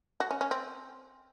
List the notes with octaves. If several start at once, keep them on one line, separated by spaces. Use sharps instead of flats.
F#4
C#4
C#4
C4